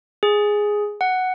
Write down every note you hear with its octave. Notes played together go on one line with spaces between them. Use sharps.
G#4
F#5